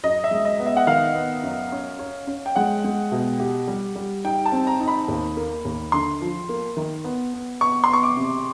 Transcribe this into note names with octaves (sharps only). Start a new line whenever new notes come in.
F#2 D#5
E5
G#3
D#5
B3
E5
F#5
D#3 F5
B3
F#2
C#4
C#4
C#4
G5
G#3 F#5
G#3
B2
G4
G3
G3
D#4 G5
A5
C4
A#5
D#4
B5
D#2
A#3
D#2
D3 C6
F3
A#3
D#3
B3
B3
B3 C#6
C6
B3 C#6
D6
C3